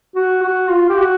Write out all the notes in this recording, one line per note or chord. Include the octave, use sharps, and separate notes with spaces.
F#4
F#4
F4
G4
F#4